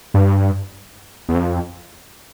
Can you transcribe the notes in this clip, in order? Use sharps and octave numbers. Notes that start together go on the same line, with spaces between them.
G2
E2
F2